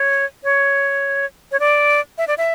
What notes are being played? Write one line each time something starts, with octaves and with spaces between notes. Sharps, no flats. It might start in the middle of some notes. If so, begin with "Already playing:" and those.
Already playing: C#5
C#5
C#5
D5
E5
D5
E5